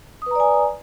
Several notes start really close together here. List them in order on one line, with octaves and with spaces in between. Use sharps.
D#6 B4 A#5 D5 G#5